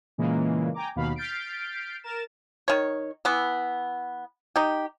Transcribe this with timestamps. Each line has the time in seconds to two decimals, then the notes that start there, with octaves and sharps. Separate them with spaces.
0.18 A#2 C#3 E3 G#3 A#3
0.74 G5 G#5 A#5 D6
0.96 D#2 B2 D#3 F5 B5
1.16 F6 G6 A6 B6 C7 D7
2.03 A#4 A6 E7
2.68 D#3 C#5
3.25 E3 B3
4.56 D#4 G4